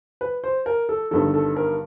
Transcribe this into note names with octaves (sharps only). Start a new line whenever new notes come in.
B4
C5
A#4
A4
G1 G2 D#3 A4
A4
A#4